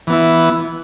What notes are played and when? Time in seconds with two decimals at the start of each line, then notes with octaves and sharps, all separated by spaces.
0.07 E3
0.10 B3
0.12 E4